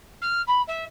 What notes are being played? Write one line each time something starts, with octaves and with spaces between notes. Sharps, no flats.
F6
B5
E5